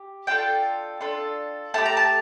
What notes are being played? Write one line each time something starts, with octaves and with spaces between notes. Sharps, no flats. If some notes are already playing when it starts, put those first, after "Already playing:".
Already playing: G4
D4 F4 A4 G5
D4 F4 A4
A3 E4 G4 A5
A#5
A5